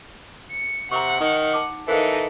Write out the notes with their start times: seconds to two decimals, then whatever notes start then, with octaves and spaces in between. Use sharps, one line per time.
0.51 C#7
0.91 C3 F#5 A#5 C#6
1.20 D#3 D#4
1.54 A5 D6
1.88 E3 D#4 A4 A#4 C5 F5